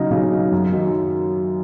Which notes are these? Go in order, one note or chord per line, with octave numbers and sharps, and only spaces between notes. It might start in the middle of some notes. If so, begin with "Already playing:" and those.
Already playing: C#3 F#3 D#4
C#3
F#3 D#4
F#2
D#3 F#3